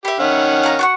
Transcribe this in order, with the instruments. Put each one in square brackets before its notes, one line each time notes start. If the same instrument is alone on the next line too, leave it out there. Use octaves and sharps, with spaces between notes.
[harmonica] G4 [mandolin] E5 B5
[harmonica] D#3 C#4 F#5
[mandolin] F5 A#5
F#4 F#5 C#6